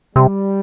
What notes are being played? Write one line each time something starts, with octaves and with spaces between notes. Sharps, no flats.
C3 G3